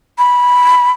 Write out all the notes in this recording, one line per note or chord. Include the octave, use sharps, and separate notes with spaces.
B5